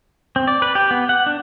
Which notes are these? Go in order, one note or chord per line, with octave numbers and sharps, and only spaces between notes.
C4
D5
B4
G4
B3
F#5
D4